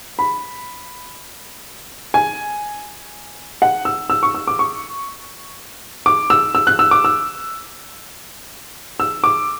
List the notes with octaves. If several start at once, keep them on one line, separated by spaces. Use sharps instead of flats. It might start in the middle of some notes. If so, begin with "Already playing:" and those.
B5
G#5
F#5
E6
E6
C#6
E6
D6
C#6
D6
E6
E6
F#6
E6
D6
E6
E6
D6